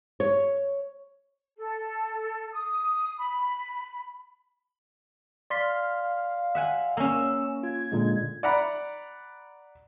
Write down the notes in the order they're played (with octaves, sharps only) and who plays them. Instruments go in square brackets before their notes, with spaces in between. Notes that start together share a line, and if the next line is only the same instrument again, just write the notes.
[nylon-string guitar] C#5
[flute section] A4
D#6
B5
[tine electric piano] D5 C6 B6 [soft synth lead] F5
[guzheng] E5 F#5 G#5
[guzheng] A#3 C#4 [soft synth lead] E6
[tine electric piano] F4 [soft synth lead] G#6
[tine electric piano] A#2 D3 G#3
[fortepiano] D5 F#5 A#5 B5